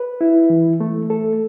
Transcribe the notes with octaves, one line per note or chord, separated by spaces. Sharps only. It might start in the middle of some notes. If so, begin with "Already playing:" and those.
Already playing: B4
E4
E3
A3
A4